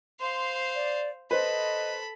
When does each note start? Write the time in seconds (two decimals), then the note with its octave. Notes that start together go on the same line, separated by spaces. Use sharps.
0.20 C5 F5 C6
0.75 D5
1.31 A4 B4 C5 D#5 B5